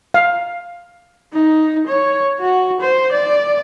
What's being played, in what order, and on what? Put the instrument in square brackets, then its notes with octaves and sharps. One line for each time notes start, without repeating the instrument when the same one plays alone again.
[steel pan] F5
[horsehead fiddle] D#4
C#5
F#4
C5
D5